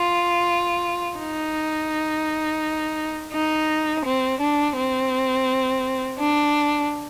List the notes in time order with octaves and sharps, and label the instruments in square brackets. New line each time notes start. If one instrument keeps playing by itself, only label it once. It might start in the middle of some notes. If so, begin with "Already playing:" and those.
Already playing: [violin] F4
D#4
D#4
C4
D4
C4
D4